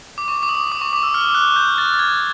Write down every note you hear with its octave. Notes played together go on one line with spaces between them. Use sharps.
D6
C#6
D6
D#6
D6
C#6
D6
E6
F6
F#6
G6
A6
G#6